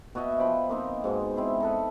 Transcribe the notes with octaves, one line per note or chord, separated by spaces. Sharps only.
B2 F#4 D#5 E5
F3 G5 B5
A#3 C4 D#4
G#2 B2 G#3
C4 E4 G#4
D#4 A4 B4